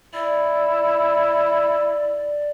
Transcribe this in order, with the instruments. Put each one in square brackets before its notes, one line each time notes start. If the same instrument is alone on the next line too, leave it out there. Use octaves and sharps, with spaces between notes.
[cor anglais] E4 [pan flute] D5